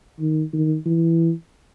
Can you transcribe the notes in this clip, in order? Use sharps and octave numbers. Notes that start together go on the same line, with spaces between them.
D#3
D#3
E3